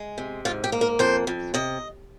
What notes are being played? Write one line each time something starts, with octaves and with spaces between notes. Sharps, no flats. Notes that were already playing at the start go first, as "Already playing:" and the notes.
Already playing: G#3
C3
G#2 F4
G4
A#3
A#4
F2 C5
F2
C3 D#5